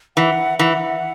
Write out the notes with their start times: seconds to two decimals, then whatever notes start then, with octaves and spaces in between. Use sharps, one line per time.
0.17 E3 F#5
0.59 E3 F#5